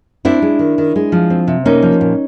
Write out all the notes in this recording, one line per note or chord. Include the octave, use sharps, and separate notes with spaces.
C4 D4 E4
G#3
D#3
D#3
G#3
F3
C4
C3
A#3 C#4 D#4
F3
A#2